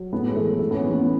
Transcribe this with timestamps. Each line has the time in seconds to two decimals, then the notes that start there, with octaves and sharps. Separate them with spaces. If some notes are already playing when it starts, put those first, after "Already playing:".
Already playing: F#3
0.12 A2 B3
0.28 G#3
0.36 E3 A3
0.59 A2 A3
0.71 B3
0.75 C#4
0.83 E3
0.91 B3